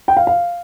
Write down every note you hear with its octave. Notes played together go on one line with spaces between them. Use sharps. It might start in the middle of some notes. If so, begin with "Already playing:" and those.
G5
F5
F5